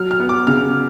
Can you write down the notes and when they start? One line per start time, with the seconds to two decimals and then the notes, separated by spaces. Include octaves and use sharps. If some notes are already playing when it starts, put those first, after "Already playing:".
Already playing: F#3 F6
0.11 F6
0.20 B3
0.29 D6
0.47 C#3 F6